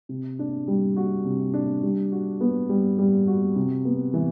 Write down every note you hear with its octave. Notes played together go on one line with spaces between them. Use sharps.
C3
D4
G3
F#4
C3
D4
G3
F#4
B3
G3
G3
F#4
C3
B3
E3